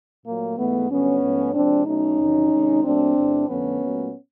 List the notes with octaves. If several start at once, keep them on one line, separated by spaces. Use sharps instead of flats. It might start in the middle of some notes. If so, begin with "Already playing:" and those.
A#2 F#3 A3 A#3
G#2 E3 G#3 A3 B3
G2 D3 F#3 B3 C#4
G#2 F3 A3
C3 F3 G#3 C4 D4
B2 F#3 A3 C#4 D#4
E2 C3 D#3 F#3
C3 D#3 G#3
A#2 F#3 A3 C4 D4
E2 C3 E3 A3
F2 D3 F3 A3 B3 C#4
A#2 F#3 A3